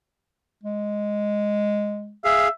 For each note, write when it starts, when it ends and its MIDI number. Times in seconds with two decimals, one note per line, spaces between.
0.63 2.15 56
2.25 2.48 68
2.25 2.48 76
2.25 2.48 77